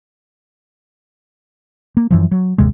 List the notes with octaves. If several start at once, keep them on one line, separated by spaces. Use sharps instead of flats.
A#3
F#2 E3 F3
F#3
G1 D#2 C3 G#3